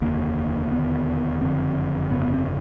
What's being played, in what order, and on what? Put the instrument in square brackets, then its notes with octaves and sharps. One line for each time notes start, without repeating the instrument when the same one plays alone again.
[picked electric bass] F1 D#2 D3 A#3
E1 D#2 D3 B3
F#1 F2 D3 C4
G1 F2 C#3 B3
B3
C4